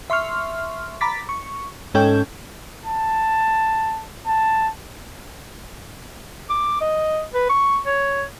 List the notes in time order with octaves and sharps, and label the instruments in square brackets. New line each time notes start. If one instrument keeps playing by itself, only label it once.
[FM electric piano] E5 C6 C#6 F6
A#5 B5 D6 A6 B6
C#6
G#2 C#4 A4 C#5 G5 G6
[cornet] A5
A5
[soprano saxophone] D6
D#5
B4
C#6
C#5